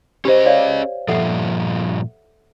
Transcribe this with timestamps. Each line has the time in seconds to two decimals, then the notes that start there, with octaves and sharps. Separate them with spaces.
0.25 C#4 G4 G#4 C5 D#5
0.46 C#5 D5 F5
1.08 G2 A#2 F3 A4 E5 F#5